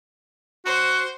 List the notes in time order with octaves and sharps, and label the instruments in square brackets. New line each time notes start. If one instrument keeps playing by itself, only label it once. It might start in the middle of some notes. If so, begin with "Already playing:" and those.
[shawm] F#4 [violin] C5